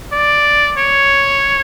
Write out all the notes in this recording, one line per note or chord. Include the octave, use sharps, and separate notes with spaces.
D5
C#5